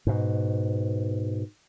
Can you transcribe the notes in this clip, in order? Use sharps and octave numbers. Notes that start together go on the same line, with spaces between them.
G#2 B2